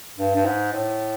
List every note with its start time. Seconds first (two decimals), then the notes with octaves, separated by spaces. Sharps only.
0.18 G2
0.35 G2
0.45 G#2
0.73 A2